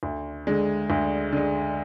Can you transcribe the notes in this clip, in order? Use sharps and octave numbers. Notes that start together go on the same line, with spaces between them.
D2
D3 G#3
D2
D3 G#3